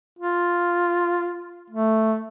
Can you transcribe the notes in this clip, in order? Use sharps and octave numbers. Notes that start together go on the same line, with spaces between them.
F4
A3